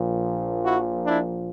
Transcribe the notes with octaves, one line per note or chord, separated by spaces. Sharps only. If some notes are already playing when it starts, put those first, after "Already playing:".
Already playing: A#1 A#2 F3
E4 F#4
D4 E4